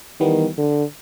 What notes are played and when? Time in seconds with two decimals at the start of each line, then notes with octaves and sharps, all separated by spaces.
0.20 D#3 E3 G3 B3
0.58 D3